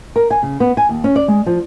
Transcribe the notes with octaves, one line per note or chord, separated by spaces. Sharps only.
A#4
G#5
C#3
B3
G#5
D#2
C#4
D5
G#3
F3